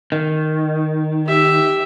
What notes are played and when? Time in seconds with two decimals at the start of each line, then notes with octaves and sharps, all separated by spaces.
0.12 D#3
1.27 G4 E5